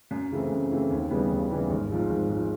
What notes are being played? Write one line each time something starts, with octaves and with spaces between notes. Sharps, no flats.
F#2
C#3 E3 A3 C4
F#2
C#3 E3 A3 C4
D#2
C#3 E3 G3 B3
D#2
C#3 E3 G3 B3
G#1
G#2 F3 G#3
G#1
G#2 F3 G#3